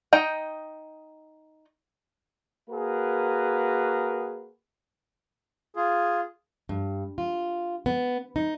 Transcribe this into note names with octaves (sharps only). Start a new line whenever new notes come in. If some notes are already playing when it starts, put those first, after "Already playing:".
D#4 D#5 G5
A#3 F#4 G#4 A#4 B4
F4 G#4
G2
F4
B3
D#4